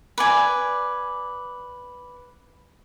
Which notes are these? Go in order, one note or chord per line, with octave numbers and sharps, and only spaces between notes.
B4 D5 G#5